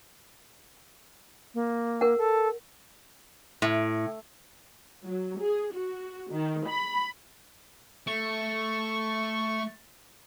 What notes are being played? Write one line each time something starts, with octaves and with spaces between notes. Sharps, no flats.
A#3
A#4 F#5
A4
A2
F#3
G#4
F#4
D#3
B5
A3 C#6